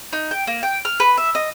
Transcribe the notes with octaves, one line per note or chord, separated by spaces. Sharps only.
D#4
G5
A#3
G5
F6
B4
E5
D#5